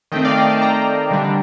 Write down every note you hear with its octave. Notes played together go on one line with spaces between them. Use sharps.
D#3 A3 C4 D#5 G5
D5 F5
D#5 G5
F5 A5
G5 A#5
D3 G3 D4